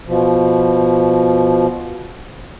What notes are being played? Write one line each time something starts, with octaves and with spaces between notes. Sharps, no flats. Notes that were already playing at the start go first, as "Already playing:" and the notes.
B2 F3